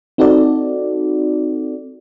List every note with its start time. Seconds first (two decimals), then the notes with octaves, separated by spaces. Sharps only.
0.18 C4 D#4 F#4 A4 D5